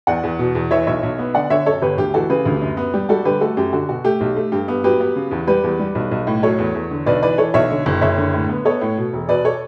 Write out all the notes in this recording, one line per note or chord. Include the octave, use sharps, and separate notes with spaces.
E2 D5 F#5
E2
B2
E2
E3 C#5 E5
B1 C#5 E5
B1
B3
D3 D5 F#5
D3 C#5 E5
F#2 A4 C#5
G1 G4 B4
D2 G4
E3 F#4 A4
C#3 G4 B4
D2
F#2
B3
G3 G4
G3 F#4 A4
D3 G4 B4
A3 F#4 A4
F#2 G4
D3 F#4
B2 F#4
A3 G4
B1
A3
G2 G4
B3
F#3 G4 B4
B3
C#3
E2
G3 G4 B4
E2
G3
B1
B1
A2
F#3 A4 C#5
E2
E2
D3
B1 B4 D5
E3 B4 D5
E3 A4 C#5
B1 C#5 E5
D3
F#1
F#1 C#5 E5
D3
A2
B3
B3 A4 C#5
A2
B2
E1
B2 B4 D5
A4 C#5